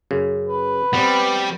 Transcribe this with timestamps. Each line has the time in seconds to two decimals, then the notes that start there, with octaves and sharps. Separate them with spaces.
0.11 F#2 C#3
0.49 B4
0.93 G3 B3 C4